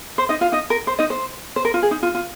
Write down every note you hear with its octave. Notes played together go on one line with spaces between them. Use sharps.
C5
D#4 D#5
F4 F5
D#4 D#5
A#4
C5
D#4 D#5
C5
C5
A#4
F4
G#4
D#4
F4
F4